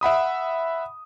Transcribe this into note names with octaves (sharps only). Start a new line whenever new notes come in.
E5 F#5 B5 D#6